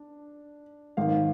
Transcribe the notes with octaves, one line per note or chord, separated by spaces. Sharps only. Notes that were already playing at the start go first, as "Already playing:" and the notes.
Already playing: D4
G#1 G#2 D#3 F5